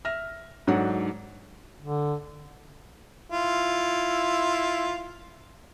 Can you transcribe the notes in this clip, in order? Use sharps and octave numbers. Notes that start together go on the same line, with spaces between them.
E5 F6 A#6
G#2 F#3 D4 A4 F#5
D3
E4 F4